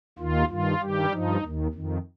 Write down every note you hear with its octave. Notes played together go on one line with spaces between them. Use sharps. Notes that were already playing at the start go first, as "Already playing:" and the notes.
D#2 D#3 F4
G2 D#3 F4
G2 D#3 G3 G4
G2 F3 D#4
D#2 D#3
F2 D#3